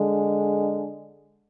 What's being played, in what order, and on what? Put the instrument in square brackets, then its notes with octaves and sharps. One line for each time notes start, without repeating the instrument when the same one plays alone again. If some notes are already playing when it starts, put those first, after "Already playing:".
Already playing: [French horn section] D3 G#3